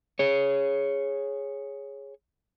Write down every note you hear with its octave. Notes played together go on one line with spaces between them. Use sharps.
G#4 C#5